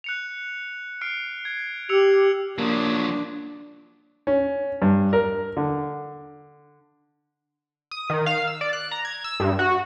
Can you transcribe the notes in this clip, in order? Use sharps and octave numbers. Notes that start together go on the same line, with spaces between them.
F#6 C#7 F7
F6 C7 D7
G#6
G4 E6 C#7 F7
F3 F#3 A#3 D4
C#4
G2
A#4
D3
D#6
D#3
F5
E6
D5
F#6
A#5
G#6
E6
G2
F#4